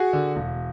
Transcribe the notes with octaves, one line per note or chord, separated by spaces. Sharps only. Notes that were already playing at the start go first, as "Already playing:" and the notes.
Already playing: F#4 G#4
D3
E1